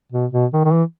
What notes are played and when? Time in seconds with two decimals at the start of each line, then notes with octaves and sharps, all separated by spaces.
0.12 B2
0.32 B2
0.53 D#3
0.65 D#3
0.73 E3